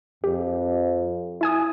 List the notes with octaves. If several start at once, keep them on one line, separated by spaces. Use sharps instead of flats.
F2 G4
E4 G#5 D#6